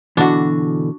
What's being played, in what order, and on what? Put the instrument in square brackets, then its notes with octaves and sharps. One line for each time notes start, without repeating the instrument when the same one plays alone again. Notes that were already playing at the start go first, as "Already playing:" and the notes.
[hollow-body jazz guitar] B2 D3 E3 [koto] D4 F#4